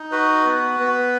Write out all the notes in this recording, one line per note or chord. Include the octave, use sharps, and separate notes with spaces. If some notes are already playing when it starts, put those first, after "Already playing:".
Already playing: D#4
F#4 B4
B3
B3